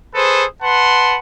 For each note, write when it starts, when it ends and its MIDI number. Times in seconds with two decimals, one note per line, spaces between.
0.15 0.45 68
0.15 0.45 69
0.15 0.45 71
0.15 0.45 72
0.62 1.18 71
0.62 1.18 78
0.62 1.18 81
0.62 1.18 84